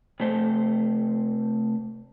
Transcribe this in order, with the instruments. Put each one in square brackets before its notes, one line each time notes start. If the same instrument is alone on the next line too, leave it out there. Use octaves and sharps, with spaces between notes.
[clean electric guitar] C3 A3 C5